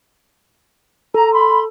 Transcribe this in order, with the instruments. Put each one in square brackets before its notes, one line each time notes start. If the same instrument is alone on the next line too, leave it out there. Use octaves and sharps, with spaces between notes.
[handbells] A4 [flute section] A#5
[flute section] B5 C6